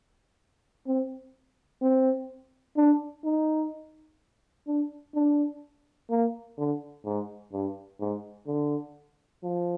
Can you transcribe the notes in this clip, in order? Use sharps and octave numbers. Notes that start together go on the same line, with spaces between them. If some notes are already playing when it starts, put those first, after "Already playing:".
C4
C4
D4
D#4
D4
D4
A#3
D3
G#2
G2
G#2
D3
F3